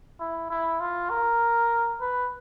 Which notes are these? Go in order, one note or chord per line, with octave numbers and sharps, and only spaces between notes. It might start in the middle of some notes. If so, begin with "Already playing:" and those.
E4
E4
F4
A#4
B4